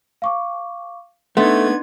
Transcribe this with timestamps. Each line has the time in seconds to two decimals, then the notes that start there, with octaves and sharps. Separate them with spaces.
0.22 F5 C#6 D6
1.37 A3 B3 D4 D#4 C6 G#6 A6